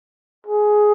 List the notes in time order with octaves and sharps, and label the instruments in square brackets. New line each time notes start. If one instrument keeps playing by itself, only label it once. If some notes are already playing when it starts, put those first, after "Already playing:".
[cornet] G#4